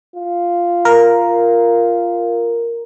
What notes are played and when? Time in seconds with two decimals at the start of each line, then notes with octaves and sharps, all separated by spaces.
0.16 F4
0.85 A#4